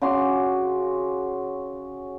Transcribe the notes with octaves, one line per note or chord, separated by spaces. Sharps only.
C#3 F#4 C6 D6